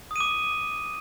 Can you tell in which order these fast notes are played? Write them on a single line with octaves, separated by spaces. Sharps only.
D#6 D#7 D6